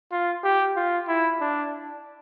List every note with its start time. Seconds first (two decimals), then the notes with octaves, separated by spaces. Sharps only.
0.11 F4
0.44 G4
0.76 F4
1.08 E4
1.41 D4